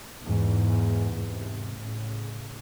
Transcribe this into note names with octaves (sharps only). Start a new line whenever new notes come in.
E2 G#2
G#2 C3
A2 C#3